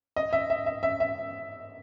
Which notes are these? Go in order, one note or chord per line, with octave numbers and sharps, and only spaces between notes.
D#5
E5
E5
E5
E5
E5